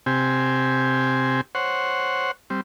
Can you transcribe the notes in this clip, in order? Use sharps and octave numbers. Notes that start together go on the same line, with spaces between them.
C3 C4 G4 G#5
C5 C#5 F#5
G3 C4